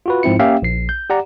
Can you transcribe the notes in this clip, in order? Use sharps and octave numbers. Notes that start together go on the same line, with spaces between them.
F4 F#4 B4
G#2 F3 C4 E4 C#7
A#3 C#4 G4 E5 F5 G5
A#1 C7
G6
G4 D5 F#5 A#5